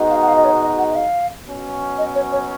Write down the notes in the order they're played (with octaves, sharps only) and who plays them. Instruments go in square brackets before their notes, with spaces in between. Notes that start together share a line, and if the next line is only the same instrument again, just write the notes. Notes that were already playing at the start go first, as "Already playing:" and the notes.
Already playing: [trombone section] B2 G#3 D#4 F#4
[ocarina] F5
F#5
F5
D#5
C#5
D#5
F#5
D#5
F5
[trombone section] B2 F#3 C#4
[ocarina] D#5
C#5
C#5